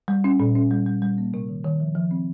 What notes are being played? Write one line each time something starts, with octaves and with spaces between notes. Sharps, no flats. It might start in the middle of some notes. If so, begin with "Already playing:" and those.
G3
C#4
A#2
C#4
G3
G3
G3
A#3
C3
D#3
D#3
F3
F3
C4